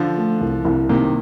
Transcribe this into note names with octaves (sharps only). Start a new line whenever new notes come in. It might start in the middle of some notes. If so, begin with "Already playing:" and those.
Already playing: D3 F3
A3
C2
C2
C3 D#3 A#3